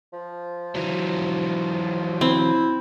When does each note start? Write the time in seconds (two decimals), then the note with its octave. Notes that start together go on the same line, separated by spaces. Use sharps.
0.13 F3
0.75 E3 F#3
2.21 C4 E4